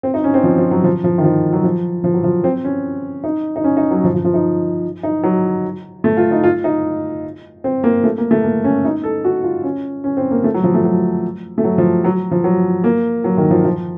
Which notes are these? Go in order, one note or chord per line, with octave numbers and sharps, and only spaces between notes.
C4
D#4
C#4
C4
F3
F3
F#3
F3
F3
D#3
F3
F#3
F3
F3
F#3
F3
C4
C#4
D#4
D#4
C#4
D#4
F#3
F3
F3
F3
D#4
D#4
F#3
A3
F4
D#4
F4
D#4
C4
A#3
A3
A#3
A3
A#3
C#4
D#4
A4
F#4
F4
C#4
C#4
C4
A#3
A3
F#3
F3
A3
F#3
A3
F#3
F3
F#3
F3
F#3
A#3
F#3
D#3
F3
F3